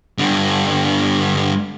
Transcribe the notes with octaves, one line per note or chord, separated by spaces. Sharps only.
G2 D3